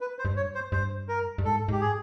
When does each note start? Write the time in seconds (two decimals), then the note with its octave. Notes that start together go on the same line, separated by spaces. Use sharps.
0.01 B4
0.19 C5
0.25 G2
0.36 C#5
0.55 C5
0.72 G2 C5
1.09 A#4
1.38 G2
1.44 G#2 A4
1.68 G#2 G4
1.81 G#4